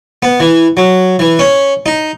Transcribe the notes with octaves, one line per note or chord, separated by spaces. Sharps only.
B3
E3
F#3
E3
C#4
D#4